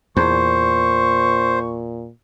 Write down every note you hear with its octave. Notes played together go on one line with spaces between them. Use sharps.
E2 A#2 C5 C#6